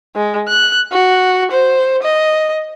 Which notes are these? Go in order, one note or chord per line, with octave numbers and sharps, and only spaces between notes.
G#3
F#6
F#4
C5
D#5